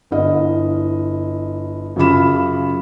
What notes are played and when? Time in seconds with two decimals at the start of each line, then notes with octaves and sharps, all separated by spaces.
0.11 G1 E4 D#5
1.96 F#2 C#3 F4 B5 E7